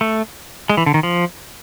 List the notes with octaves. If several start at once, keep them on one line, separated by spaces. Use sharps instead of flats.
A3
G#3
E3
D3
D#3
F3